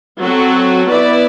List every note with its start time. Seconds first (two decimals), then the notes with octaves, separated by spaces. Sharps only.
0.20 F#3 C4 F#4 A4
0.86 B3 E4 B4 D5